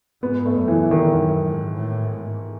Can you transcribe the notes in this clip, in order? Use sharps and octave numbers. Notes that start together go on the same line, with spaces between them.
G#2 B3
A3
F#2
E3
E2
D#3
F#2
G#2
A2
G#2